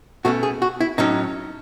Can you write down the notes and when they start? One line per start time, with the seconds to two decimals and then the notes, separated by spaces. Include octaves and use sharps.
0.25 B2 A3 C#4 F#4
0.43 G#4
0.62 F#4
0.81 E4
0.98 A2 F#3 C#4 D#4